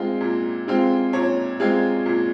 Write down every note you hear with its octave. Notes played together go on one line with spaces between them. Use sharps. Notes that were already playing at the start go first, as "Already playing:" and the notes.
Already playing: G#3 C4 F4
A#2
G#3 C4 F4
A#2 C#5
G#3 C4 F4
A#2